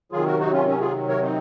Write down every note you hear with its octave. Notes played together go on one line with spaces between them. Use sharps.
C3 D#3 F#3 F4 G#4
F#4 A#4
D#4 F#4
C#4 F4
C#4
F4 G#4
A#4 C#5
C4 D#4